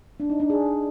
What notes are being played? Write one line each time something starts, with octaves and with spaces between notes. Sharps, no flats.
D4
D#4
D4
G#4